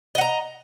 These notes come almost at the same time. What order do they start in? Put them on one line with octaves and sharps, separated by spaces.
D#5 F#5 A#5